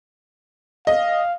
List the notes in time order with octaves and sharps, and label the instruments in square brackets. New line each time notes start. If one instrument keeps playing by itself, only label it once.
[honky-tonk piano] D#5 [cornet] F5